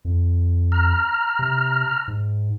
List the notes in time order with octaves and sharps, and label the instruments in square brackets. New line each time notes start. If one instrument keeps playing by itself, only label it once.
[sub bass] F2
[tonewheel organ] A#5 F6
[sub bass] C3
G#2